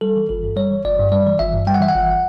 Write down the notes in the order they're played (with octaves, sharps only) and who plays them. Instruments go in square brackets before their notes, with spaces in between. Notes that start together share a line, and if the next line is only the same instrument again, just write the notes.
[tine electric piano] G3 A4
E3
G1 A4
G2
G3 C#5
E3
G1 D5
G2
G3 D5
E3
G1 E5
G2
G3 G5
F#5
E3 E5
F#5
G1